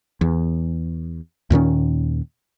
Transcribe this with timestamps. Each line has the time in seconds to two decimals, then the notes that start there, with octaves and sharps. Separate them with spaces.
0.21 E2
1.50 D#2 A#2 D#3 C#4